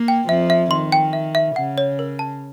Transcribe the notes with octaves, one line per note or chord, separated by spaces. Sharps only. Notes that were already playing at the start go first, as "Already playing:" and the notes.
Already playing: A#3
G5
F2 F3 E5
E5
D#3 C6
G5
E5
E5
C#3 F#5
C#5
A#4
A5